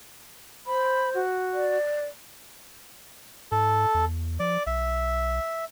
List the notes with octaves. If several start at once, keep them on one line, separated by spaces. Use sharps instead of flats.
C5 B5
F#4
D5
G#2 A4
E2
F3 D5
B1 E5